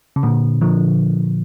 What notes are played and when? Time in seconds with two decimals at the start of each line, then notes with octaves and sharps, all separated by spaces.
0.16 C#3
0.23 A#2 D3
0.61 D3 F3